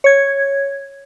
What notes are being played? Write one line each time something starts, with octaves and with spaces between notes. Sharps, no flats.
C#5 G#6